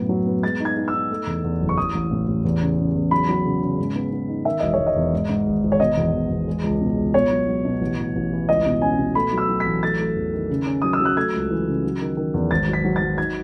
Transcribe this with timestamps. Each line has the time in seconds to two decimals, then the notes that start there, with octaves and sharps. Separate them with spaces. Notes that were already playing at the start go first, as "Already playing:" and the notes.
Already playing: F#2 A2 B3
0.09 F#3
0.26 B3
0.43 G#3 A6
0.60 D#4
0.65 G#6
0.77 D#4
0.88 E6
0.94 D#4
1.10 A3
1.27 E2
1.44 E2
1.61 F#1
1.69 C#6
1.77 A1 D#6
1.94 A1
2.11 A2
2.28 A1
2.45 E2
2.61 C#3
2.78 C#3
2.95 E2
3.11 F#3 B5
3.28 F#3
3.45 C#3
3.62 C#3
3.78 G#2
3.95 B3
4.12 B3
4.29 D#4
4.45 D#3 E5
4.60 E1 D#5
4.73 C#5
4.79 E1
4.87 D#5
4.96 E2
5.13 G#2
5.29 G#2
5.46 G#1
5.63 G#1
5.72 C#5
5.80 B2 D#5
5.97 E2
6.13 E2
6.30 E2
6.47 G#3
6.64 C#2
6.81 B2
6.97 C#2
7.14 B2 C#5
7.31 F#3
7.47 F#3
7.65 B2
7.81 A1
7.98 A1
8.15 A1
8.32 E3
8.48 C#2 D#5
8.65 B2
8.82 C#4 G#5
8.98 B2
9.15 A3 B5
9.32 F#3
9.38 E6
9.49 F#3
9.60 A1 B6
9.83 A3 A6
9.99 A3
10.16 E2
10.33 D#3
10.50 C#3
10.66 C#4
10.82 F#3 D#6
10.93 E6
11.00 F#3
11.05 F#6
11.17 A3 G#6
11.33 C#2
11.50 E3
11.67 C#3
11.84 F#3
12.01 D#3
12.17 D#3
12.34 E2
12.51 G#1 A6
12.68 F#3
12.73 B6
12.85 F#3
12.96 A6
13.01 F#3
13.18 D#4 G#6